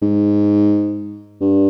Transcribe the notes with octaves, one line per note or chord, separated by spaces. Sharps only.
G#2
G2